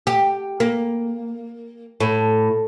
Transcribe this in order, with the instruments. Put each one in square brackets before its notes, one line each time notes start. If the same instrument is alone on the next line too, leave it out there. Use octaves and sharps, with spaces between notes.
[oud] G4
A#3
A2